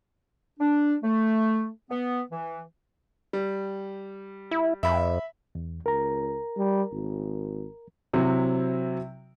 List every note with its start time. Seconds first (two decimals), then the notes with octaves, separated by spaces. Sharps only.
0.60 D4
1.03 A3
1.91 B3
2.30 E3
3.33 G3
4.51 E4
4.83 F2 E5 B5
5.55 E2
5.86 C#2 A#4 A#5
6.58 G3
6.93 G#1
8.13 C3 F#3 C4 E4